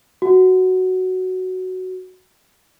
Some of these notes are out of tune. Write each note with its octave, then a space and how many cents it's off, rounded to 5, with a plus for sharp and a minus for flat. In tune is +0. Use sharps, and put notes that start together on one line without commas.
F#4 +5